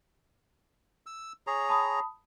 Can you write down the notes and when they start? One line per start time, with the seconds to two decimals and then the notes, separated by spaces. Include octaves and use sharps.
1.06 E6
1.47 G#4 C#5 A#5
1.69 A5 B5 D#6